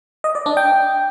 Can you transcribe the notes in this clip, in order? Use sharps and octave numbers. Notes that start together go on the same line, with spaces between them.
D#5
D5
D4
G5